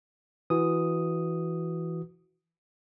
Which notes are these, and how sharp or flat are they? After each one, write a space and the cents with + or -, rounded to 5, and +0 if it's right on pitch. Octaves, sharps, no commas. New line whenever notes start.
E3 +0 F#4 +0 D#6 +0